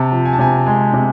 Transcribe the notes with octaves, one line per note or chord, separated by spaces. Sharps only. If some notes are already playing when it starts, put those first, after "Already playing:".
Already playing: C3 A5
F3
G#5
A5
C3 G#5
G#3 G#5
C3